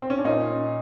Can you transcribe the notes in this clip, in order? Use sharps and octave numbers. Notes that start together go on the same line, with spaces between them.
C4
C#4
D4
A#2 C#4 D#4